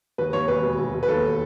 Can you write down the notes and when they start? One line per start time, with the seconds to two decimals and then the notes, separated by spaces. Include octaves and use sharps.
0.18 D#2 B4
0.33 D#2 C#5
0.48 E1 B4
0.63 E1
0.79 E1
0.94 E1
1.03 B4
1.08 D#2 A4